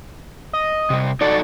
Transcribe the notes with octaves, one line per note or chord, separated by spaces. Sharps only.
D#5
C3 G3
D#4 F#4 A4 D5